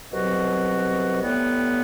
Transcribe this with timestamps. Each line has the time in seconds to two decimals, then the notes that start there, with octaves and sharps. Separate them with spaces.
0.12 C2 B2 F#3 C4 F#4
1.21 A2 G3 B3